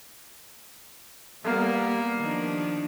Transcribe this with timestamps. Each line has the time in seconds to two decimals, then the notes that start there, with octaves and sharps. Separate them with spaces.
1.44 G3 A#3 B3
2.18 D#3 F3 D4